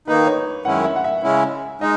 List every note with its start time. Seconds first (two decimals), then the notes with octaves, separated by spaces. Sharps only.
0.08 D#3 A#3 D#4 B4
0.27 C#5
0.65 F#2 D#3 G#3 C#4 E4 F#5
0.84 E5
0.96 F#5
1.04 E5
1.23 C#3 G#3 C#4 E4
1.81 G#3 D#4 D#5